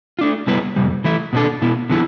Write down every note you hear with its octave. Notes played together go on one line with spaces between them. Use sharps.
F4
A3 D4
C3 G3 B3 E4 B4
F2 C3 G3
E3 A3 E4
B2 G3 B3 D4 A4
B2 B3 E4
D3 F3 B3 E4